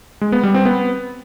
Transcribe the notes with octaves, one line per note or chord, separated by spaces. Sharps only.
G#3
B3
G3
C4
B3